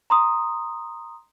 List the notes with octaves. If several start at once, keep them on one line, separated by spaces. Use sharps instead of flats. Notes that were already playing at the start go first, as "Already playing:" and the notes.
A#5 C6 D#6